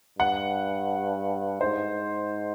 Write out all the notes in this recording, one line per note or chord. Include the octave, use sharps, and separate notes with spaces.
G2 F#5
G#2 C5